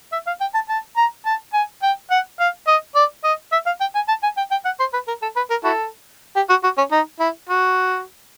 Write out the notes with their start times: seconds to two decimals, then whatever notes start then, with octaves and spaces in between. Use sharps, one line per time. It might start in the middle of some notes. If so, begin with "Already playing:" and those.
0.12 E5
0.27 F5
0.41 G5
0.54 A5
0.69 A5
0.97 A#5
1.26 A5
1.54 G#5
1.83 G5
2.11 F#5
2.40 F5
2.67 D#5
2.95 D5
3.24 D#5
3.52 E5
3.66 F5
3.81 G5
3.95 G#5
4.08 A5
4.23 G#5
4.37 G5
4.51 G5
4.65 F#5
4.79 C5
4.94 B4
5.08 A#4
5.22 A4
5.36 B4
5.50 A#4
5.64 E4 F#4 A4
6.36 G4
6.49 F#4
6.64 F#4
6.78 C#4
6.91 D#4
7.20 E4
7.49 F#4